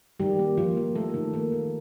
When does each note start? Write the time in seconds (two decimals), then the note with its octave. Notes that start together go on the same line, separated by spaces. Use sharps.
0.20 D#3 G3 G4
0.39 A#3
0.57 F3 A#3 F4
0.77 A#3
0.95 A3 A#3 A4
1.14 D#3
1.34 A#3
1.52 D#3